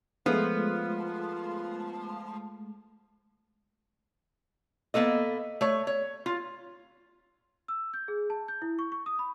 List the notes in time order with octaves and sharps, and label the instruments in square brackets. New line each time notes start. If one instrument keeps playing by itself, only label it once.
[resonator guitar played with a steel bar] F3 [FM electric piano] G#3 A3 [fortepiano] B3 [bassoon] F4
[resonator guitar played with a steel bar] A#3 B3 A4 D#5
A3 C#5
C#5
F4
[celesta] E6
G6
G#4
A5
G6
E4
C#6
C#6
D#6
B5